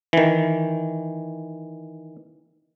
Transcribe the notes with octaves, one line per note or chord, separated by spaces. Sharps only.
D#3 E3